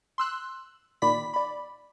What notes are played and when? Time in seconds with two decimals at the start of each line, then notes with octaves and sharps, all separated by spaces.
0.18 C6 E6 F#6
1.02 A#2 D#3 D5 B5 B6
1.34 D5 B5